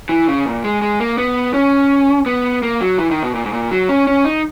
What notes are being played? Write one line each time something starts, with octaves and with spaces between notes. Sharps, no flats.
E3
C#3
A#2
G#3
G#3
A#3
B3
C#4
B3
A#3
F#3
E3
D#3
B2
A#2
G#2
A#2
F#3
C#4
C#4
D#4